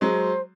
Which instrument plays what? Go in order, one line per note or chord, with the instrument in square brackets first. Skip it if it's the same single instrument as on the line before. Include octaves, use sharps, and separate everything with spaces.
[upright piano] F#3 G#3 [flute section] C5